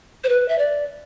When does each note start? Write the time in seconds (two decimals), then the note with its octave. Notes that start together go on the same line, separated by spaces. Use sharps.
0.24 C5
0.29 B4
0.48 E5
0.58 D5